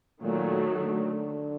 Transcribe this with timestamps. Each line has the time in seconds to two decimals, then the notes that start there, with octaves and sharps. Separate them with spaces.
0.22 A#2 D#3 F#3 A3
0.79 D3